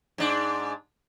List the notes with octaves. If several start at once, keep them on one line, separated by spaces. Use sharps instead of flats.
G#2 D4